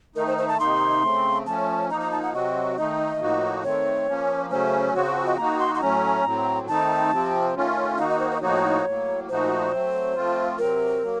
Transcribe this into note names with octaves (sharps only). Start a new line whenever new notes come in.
D#3 A3 D#4 A#4
C5
C5
A5
C3 D#3 A#3 D#4 C6
C#3 A3 C4
F3 A3 C#4 A5
F3 A#3 D#4 A#5
A#5
A5
F#5
C3 F#3 C4 F#4 D#5
D#3 A3 D#4 D#5
A2 F3 A#3 D#4 F#4
D#3 A3 C4 C#5
F3 A#3 C#4
C#3 F#3 A3 C#4 C5
C#3 F3 C4 F#4 C#5
C5
D#5
D#3 A#3 D#4 F#4 A#5
C6
C6
A2 F#3 A3 C#4 A#5
A2 F#3 C4
D#3 A3 C4 D#4 A5
C3 F3 C4
D#3 A3 C#4 F4
D#3 A#3 D#4 F#4 F5
D#5
C5
C5
D#5
A2 F3 A#3 D#4 F#4 C#5
A2 F#3 A#3
A#2 F3 A3 D#4 F#4 C5
F#3 A3 C4
F3 A3 C4 F4
C3 F#3 C4 A#4
F#3 A#3